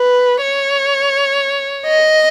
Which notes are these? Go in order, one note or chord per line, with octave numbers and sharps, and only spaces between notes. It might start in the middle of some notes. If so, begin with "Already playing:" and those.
Already playing: B4
C#5
D#5